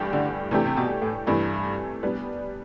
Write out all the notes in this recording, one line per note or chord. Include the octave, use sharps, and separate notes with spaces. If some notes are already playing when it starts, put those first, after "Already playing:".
Already playing: G2 E3 A3 D4 G4
D3
C3 E3 A3 D4 G4
C3
B2
A2
G2 C3 E3 A3
G3 B3 D4